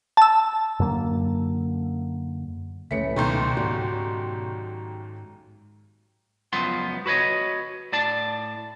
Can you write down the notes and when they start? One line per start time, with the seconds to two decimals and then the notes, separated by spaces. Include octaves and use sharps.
0.17 A5 E6
0.80 F#2 D3 A#3
2.91 C#2 A#2 E3 F3 A3 C#4 B6 C#7
3.16 B1 F#2 B2 D#3 A3 C6 G6
3.57 G#2 F#4 G4 D5
6.53 C#2 F#2 F3 B3 C6
7.06 F#4 B4 C#5 D#5
7.92 A2 D5 A5